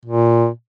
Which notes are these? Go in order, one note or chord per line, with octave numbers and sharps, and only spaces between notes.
A#2